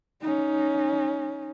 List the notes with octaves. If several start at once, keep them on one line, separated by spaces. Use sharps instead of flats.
C#4 D#4